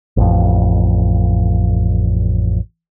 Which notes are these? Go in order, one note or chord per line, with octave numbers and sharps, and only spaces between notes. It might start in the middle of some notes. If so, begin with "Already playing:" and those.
A1 F2